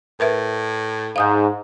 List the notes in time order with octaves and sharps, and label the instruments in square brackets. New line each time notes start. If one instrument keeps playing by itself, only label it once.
[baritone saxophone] A2 [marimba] A#4 B4 E5
[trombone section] G#2 [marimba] F5 D#6 G6